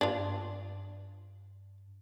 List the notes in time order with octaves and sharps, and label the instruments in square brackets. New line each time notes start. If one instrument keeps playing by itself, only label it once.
[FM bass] G2 [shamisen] D4 F4